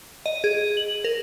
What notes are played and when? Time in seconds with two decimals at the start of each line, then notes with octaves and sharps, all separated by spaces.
0.26 D#5
0.44 G#4
0.77 F#7
1.04 A#4